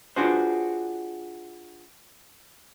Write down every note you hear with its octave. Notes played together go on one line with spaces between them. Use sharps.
D4 F4 F#4 G#4 B4 C5